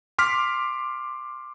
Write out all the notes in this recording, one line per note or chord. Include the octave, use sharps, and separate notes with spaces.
C6 D6 F6 B6